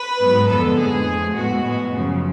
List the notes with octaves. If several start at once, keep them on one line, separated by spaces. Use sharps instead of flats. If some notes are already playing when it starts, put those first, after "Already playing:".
Already playing: B4
G#2 F#3 B3
F2 D3 F3 G#3 B3 A4
A2 F3 G#3 B3 G#4
F2 F3 A3
A2 G#3 B3 F#4
A2 G#3 B3
F#2 C#3 F3